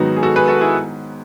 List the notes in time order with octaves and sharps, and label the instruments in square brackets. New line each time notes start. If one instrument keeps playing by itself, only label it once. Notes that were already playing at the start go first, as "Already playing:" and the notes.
Already playing: [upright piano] G#2 D#3 F#3 B3 [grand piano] D#4 F#4
[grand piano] G#4
F#4 A4
G#4 B4
F#4 A4
E4 G#4